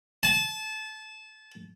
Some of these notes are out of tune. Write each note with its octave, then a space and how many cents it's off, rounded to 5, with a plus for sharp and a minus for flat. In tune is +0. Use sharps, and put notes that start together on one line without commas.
A5 -25